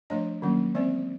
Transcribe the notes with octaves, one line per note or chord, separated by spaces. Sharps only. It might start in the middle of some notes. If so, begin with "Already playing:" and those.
F3 A3 D4 C#5 D#5
D#3 F#3 A#3 C#4
E3 G#3 C4 C5 D5